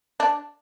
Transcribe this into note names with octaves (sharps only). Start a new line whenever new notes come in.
D4